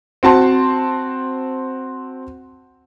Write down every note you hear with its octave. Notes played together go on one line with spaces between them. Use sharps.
C4 F#4 A5 C6